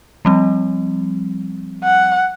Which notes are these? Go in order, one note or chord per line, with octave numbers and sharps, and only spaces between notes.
F3 G3 C4
F#5